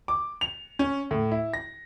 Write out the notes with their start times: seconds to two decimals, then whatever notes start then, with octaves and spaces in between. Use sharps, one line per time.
0.08 D6
0.41 F7
0.79 C#4
1.11 A2
1.31 E4
1.54 A#6